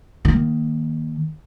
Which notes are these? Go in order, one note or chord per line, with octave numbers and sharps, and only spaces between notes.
D#3 A#3